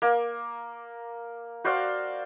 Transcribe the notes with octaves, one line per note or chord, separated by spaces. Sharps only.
A#3
F#4 C5 D5 F5